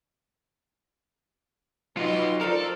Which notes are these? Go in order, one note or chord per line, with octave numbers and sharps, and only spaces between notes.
F#3 D#4 F4 B4 C6
F3 A3 A4 A#4 C5 D5 D#5 F5